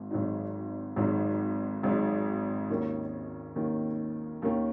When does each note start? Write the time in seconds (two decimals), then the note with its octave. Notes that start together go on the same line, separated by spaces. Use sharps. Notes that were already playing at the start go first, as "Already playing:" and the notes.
Already playing: G#1 G#2
0.11 G#1 G#2 F#3 D#4
0.96 G#1 G#2 F#3 D#4
1.83 G#1 G#2 F#3 D#4
2.70 D#2 D#3 A#3 C#4
3.56 D#2 D#3 A#3 C#4
4.42 D#2 D#3 A#3 C#4